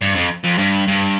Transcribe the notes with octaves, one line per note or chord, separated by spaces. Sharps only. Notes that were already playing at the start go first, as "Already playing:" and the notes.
G2
F2
F2
G2
G2